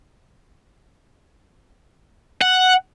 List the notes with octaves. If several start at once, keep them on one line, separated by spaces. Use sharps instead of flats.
F#5